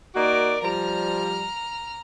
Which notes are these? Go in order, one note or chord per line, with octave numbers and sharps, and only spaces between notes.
A#3 D#4 F#4 A#4 D5
F3 G3 A#5 F6